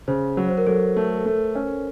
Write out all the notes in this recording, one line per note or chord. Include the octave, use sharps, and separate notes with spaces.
C#3 C5
F#3
C5
A#4
F#3 A4
A3
A3
C#4